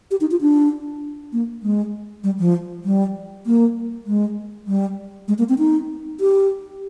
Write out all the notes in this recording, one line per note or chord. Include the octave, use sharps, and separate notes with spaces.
G4
D#4
F4
D4
A#3
G#3
G3
F3
G3
A#3
G#3
G3
G#3
A#3
C4
D#4
G4